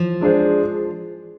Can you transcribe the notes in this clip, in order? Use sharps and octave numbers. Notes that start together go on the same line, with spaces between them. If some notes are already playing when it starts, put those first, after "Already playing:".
Already playing: F3
G#3 D4 G#4 C5